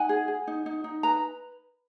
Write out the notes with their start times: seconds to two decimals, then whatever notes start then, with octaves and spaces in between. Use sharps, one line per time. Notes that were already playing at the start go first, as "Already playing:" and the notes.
Already playing: D#4 F#5 G#5
0.09 G#4
0.28 G#4
0.47 D#4
0.66 D#4
0.84 D#4
1.03 B4 A#5